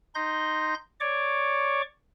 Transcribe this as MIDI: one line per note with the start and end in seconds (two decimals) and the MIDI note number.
0.15 0.74 63
0.15 0.74 84
0.15 0.74 91
0.15 0.74 94
1.00 1.82 73
1.00 1.82 74
1.00 1.82 85
1.00 1.82 86